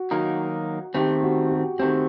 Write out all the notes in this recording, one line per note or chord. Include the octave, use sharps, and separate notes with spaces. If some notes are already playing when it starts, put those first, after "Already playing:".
Already playing: F#4
D#3 F#3 A#3 D#4
D#3 A3 C4 G4
F#4
F#4
D#3 A3 C4 G4